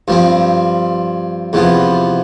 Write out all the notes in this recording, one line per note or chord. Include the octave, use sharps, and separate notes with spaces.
G2 F3 C4
E2 C3 F3 B3